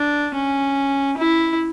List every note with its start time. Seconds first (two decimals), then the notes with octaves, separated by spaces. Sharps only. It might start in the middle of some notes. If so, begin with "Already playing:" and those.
Already playing: D4
0.34 C#4
1.17 E4